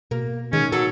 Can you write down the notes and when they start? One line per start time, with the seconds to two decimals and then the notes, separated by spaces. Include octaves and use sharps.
0.11 B2 A#3
0.53 D#3 G#3 C#4
0.72 F#3 A#3 A4